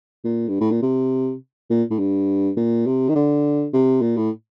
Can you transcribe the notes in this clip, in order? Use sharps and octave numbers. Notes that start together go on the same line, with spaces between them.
A#2
G2
A2
A#2
C3
A#2
A2
G2
A#2
C3
D#3
D3
C3
A#2
A2